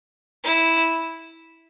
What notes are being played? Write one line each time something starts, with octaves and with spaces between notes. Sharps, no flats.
E4